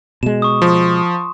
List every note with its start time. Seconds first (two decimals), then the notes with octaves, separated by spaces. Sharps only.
0.23 B2 G#3 E7
0.42 C#6 D#6
0.62 F3 C6